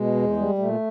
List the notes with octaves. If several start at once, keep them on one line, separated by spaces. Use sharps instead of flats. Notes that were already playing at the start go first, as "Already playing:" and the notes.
Already playing: B2 G#3
E2
G3
A#2 A3